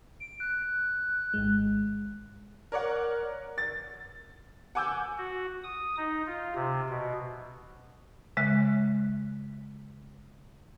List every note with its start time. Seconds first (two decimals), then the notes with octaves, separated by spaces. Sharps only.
0.20 D7
0.40 F#6
1.34 G#1 G#2 G#3
2.72 A#4 C#5 D5 F#5
3.58 A6
4.75 F#5 G#5 D6 E6 G6
5.18 F#4
5.64 D#6
5.98 D#4
6.26 F4
6.55 C3
6.90 B2
8.37 C#3 G#3 E5 F#6